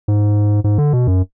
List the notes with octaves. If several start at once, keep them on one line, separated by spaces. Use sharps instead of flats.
G#2
G#2
D3
B2
F#2